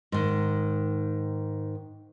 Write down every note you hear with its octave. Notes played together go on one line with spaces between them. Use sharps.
G#2 D#3